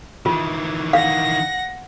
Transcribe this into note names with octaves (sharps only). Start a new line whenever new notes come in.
D#3 E3 F4
F5 F#5 A#6